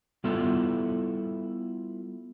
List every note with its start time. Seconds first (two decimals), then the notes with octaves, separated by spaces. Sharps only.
0.24 G3 B3 E4 F4 A4